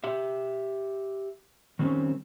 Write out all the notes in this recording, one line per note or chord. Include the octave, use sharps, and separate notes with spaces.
G4 E5
D#3 G3 C4 C#4